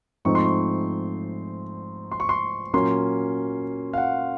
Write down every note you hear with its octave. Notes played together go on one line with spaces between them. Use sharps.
G#2 F3 A3 C4 D#4 C#6
C6
C#6
C6
C#6
C6
A#2 F#3 A#3 C#4 C6
F5
F#5